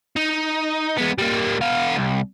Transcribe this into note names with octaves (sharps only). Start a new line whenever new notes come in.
D#4
G#3 B3
G3 A#3
B3 F5
C2